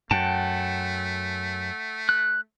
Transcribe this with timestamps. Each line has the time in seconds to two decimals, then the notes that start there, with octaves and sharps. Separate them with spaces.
0.11 F#2 A3 F#5 G5 A5
2.09 F#6